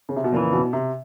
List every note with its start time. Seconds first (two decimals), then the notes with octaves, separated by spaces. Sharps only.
0.09 C#3
0.16 C3
0.24 B2
0.32 F2 A#2 C#3 E3
0.53 B2
0.73 C3